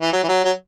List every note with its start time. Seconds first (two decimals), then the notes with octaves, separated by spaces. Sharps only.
0.02 E3
0.13 F#3
0.23 E3
0.29 F#3
0.44 F#3